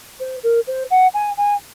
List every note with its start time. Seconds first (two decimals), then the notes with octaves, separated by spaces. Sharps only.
0.20 C5
0.43 A#4
0.67 C5
0.91 F#5
1.14 G#5
1.37 G#5